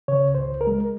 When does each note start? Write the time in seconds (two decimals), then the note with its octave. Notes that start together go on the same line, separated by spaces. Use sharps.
0.08 C#3 C#5
0.28 C#2
0.35 C5
0.48 C#2
0.61 A#4
0.67 G#3